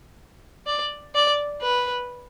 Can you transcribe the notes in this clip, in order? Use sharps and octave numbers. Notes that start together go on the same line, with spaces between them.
D5
D5
B4